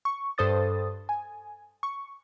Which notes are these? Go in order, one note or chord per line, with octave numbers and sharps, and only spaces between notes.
C#6
G2 A4 C5 D#6 A6
G#5
C#6